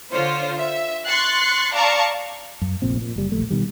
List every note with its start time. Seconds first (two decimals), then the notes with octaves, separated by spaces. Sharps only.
0.12 D3 F4 C5 C#5
0.59 E5
1.06 C6 C#6 F#6 A6 C7
1.74 D5 F5 A5 A#5 C#6
2.62 F#2
2.82 F1 A#1 A#2 C4
3.01 A#2
3.16 F#1 G3
3.32 E1 A#1 A3
3.51 B2 D#3 G3